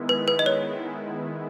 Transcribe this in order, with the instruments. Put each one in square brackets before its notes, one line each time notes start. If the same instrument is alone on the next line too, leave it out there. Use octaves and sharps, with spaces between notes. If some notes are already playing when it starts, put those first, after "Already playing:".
Already playing: [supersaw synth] D#3 G#3 B3 E4
[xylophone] B4
B4
D#5
C#5